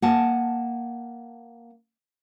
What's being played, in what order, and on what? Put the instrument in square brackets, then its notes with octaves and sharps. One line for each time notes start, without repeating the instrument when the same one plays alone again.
[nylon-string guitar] A#3 F#5 G#5 A5